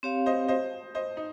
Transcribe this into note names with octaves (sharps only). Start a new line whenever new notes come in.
C4 G4 C#5 F5
C5 D#5
C5 D#5
C5 D#5
D#4